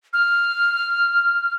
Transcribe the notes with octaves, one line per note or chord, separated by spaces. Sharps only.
F6